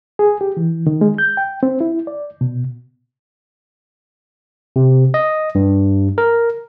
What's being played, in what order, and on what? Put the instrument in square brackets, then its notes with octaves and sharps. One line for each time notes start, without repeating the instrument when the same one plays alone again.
[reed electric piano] G#4
G4
E3
D#3
G#3
G6
G5
C4
E4
D5
B2
[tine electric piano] C3
D#5
G2
A#4